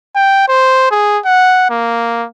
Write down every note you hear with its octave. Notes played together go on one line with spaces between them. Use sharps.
G5
C5
G#4
F#5
A#3